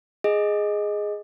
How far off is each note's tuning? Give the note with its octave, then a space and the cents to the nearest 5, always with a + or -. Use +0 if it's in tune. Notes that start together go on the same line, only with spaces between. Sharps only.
G#4 +0 D#5 +0